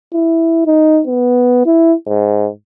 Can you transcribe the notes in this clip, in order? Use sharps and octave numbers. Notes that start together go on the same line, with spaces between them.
E4
D#4
B3
E4
G#2